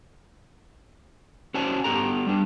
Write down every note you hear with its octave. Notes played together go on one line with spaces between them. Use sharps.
C#4 F#4 C5 D5 G#5 A5
B3 G4 A4 A#5
G3 D4